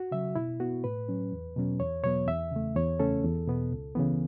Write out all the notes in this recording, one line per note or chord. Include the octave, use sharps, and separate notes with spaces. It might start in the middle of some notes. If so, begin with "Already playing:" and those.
Already playing: F#4
C#3 F#3 E5
B2 E4
B3 F#4
A2 B4
F#3 C#4
E2
B2 F#3 C#4
E2 C#5
B2 F#3 B3 C#5
E2 E5
C#3 A3
E2 C#5
C#3 A3 C#4 A4
E2
B2 B3
C#2
C#3 E3 B3